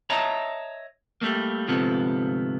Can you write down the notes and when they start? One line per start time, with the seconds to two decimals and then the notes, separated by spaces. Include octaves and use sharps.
0.10 C#5 D#5 E5 A5 A#5
1.21 G3 A3 A#3
1.68 D2 G#2 C3 F3 B3 A4